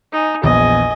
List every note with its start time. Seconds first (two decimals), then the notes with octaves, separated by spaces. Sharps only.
0.13 D#4 G#5
0.43 A#1 E2 D#5 G#5